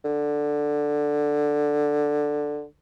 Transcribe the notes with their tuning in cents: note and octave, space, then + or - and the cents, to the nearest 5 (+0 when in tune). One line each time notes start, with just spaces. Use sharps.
D3 +5